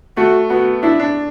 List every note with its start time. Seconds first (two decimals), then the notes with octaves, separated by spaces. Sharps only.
0.17 A3 F#4
0.50 B3 F#4
0.83 D4 E4
1.00 D4